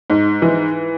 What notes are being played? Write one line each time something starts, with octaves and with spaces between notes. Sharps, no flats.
G#2
E3